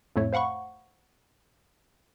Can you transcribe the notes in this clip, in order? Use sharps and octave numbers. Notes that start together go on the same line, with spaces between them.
F2 A2 A3 C#5
C5 F5 F#5 B5 C#6